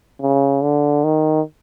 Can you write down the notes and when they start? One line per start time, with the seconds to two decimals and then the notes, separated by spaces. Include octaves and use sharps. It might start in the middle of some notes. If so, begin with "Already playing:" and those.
0.22 C#3
0.63 D3
1.04 D#3